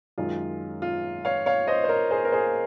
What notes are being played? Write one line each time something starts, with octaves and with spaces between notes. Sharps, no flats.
F#2 D#3 G#3 F4
F4
C#5 F5
C#5 F5
C5 D#5
C5
A#4 C#5
G#4 C5
A#4
G#4 C5